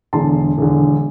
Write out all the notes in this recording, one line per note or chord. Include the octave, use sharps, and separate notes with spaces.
E1 E2 D3 A5 C6
E1 E2 D3